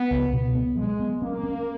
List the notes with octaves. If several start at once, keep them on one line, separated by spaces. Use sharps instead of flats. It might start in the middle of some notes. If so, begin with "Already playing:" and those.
Already playing: B3
C#2
B2
B3
F#3 G#3
B3
A#3 C#4
C#4